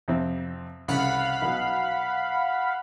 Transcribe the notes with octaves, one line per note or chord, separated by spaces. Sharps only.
F2 C3 C4
C2 C#3 F5 F#5 B5
B1 B2